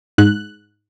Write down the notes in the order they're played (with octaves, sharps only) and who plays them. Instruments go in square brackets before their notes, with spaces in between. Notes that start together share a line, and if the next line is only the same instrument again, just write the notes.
[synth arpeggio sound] G#2 F#6